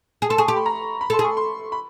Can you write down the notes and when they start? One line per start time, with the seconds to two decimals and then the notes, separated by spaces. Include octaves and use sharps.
0.22 G#4
0.30 A4 C6
0.38 G#4 C#6
0.48 G4 C6
0.56 B5
0.66 A#5
1.01 B5
1.10 A4 C6
1.19 G#4
1.24 C#6
1.37 C6
1.72 B5